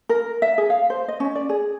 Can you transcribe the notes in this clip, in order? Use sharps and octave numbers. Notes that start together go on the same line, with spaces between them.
A#4
E5
G#4
F5
C5
D#5
C#4
D5
G#4